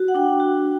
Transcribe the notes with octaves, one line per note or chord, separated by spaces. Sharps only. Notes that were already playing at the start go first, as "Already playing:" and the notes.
Already playing: F#4
F#5
D4 G5
F#4